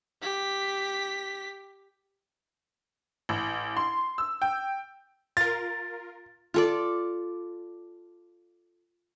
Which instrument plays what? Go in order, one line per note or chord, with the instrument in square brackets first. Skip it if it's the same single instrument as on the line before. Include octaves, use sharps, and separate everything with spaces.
[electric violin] G4 B6
[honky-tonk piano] A1
C6
E6
G5
[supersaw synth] F4 A#4 [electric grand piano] A6
[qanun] F4 A4 D5